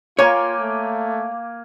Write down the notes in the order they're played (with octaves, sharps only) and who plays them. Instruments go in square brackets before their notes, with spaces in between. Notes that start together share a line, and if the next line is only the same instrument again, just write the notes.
[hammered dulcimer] A#3 G5 G#5 [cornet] F4 [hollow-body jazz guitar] C#5
[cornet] A3